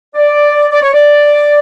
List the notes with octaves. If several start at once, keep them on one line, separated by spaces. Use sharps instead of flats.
D5
D5
C#5
D5